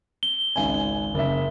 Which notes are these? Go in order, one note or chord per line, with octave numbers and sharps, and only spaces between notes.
G7
G#1 C#2 G#5
F#1 E5